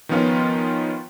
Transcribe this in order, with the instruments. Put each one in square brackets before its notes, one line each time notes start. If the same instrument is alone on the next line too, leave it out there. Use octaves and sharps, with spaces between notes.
[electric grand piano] D#3 F3 B3 C#4 F4